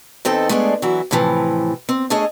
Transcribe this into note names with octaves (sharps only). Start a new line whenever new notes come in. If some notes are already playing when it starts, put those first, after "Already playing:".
E2 C4 D#4 A4
G#3 A3 B3 D4 G#4 D5
E3 F#3 E4 F#4
A2 C3 E3 F3
C4
A3 D4 G#4 C#5 D#5